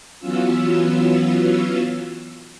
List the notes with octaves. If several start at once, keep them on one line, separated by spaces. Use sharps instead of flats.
E3 F#3 B3 C#4 F4 E6